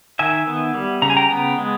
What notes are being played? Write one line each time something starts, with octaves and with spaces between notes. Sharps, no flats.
D#3 E5 G#5
B3
G3
C#3 A#5
G#5
G5 A#5
B3
G#3